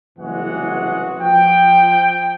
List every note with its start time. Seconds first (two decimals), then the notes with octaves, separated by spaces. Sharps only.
0.18 F#1 C2 E3 G#3 F#4 F#5
1.19 F3 G5